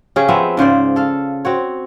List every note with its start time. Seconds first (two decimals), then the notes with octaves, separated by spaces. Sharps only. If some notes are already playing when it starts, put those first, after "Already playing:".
0.16 C#3 C#4 G4 G#4
0.28 F3 B3 C4 E5
0.57 G#2 C#3 C5 D5
0.96 A4 F5
1.45 C4 F#4 C#5